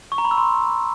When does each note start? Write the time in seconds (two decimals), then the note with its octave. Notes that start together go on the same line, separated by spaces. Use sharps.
0.12 C#6
0.18 A#5
0.25 B5
0.31 E6
0.38 C6